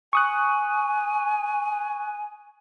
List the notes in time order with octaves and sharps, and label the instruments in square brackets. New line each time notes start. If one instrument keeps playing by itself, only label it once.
[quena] G#5 [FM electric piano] C#6 D#6 F#6